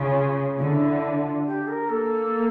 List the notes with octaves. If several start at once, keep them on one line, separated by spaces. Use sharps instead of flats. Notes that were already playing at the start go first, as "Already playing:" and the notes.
Already playing: C#3 F4
D3 E4 F4
F4
G4
A#4
A#3 A4